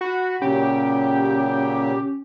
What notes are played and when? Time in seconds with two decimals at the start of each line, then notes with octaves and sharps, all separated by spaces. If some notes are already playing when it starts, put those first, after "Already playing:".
0.01 F#4 B5
0.42 A#2 C#3 F#3 C#4 G4